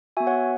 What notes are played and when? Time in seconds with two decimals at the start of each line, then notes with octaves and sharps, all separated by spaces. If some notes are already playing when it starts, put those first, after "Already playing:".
0.17 B3 F#4 E5 G#5
0.27 C#5 F#5